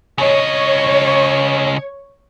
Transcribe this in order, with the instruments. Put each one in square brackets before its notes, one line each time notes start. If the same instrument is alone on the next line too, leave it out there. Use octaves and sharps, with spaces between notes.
[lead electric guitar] C#3 D#5 [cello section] C#5